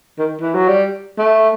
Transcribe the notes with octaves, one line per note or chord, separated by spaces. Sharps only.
D#3
E3
F#3
G3
A3